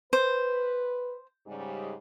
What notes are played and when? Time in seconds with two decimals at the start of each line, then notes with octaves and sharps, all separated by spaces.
0.13 B4 C5
1.47 G#2 C#3 G3